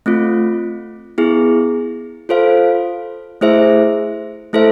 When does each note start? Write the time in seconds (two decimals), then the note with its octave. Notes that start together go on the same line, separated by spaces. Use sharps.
0.06 A3 C4 F4
1.18 B3 E4 G#4
2.29 F4 A4 C5 F5
3.41 A3 E4 G#4 C5 E5
4.53 A3 E4 A4 C5 E5